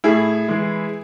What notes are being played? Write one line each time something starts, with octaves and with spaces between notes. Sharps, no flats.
A2 E4 G#4
E3 G#3